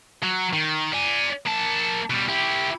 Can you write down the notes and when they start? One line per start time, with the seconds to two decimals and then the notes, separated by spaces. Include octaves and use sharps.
0.23 F#3
0.53 D#3
0.93 D5 G#5
1.46 A#3 A5
2.10 B2 G3
2.29 E4 G4